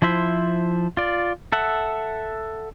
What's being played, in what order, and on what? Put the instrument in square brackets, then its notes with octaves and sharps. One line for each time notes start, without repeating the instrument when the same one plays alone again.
[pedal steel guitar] F3 E4 C5 E5
F4 D5
A4 E5 F#5